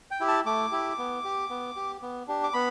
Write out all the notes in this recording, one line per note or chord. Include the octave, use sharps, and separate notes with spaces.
G5
E4 G4
A5
A3 D6
E4 G4
B3
G4
B3
G4
B3
D4 G4
D6
B3 B5